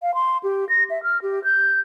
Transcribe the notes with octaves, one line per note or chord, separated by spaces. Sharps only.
F5
C6
G4
A#6
E5
F6
G4
G6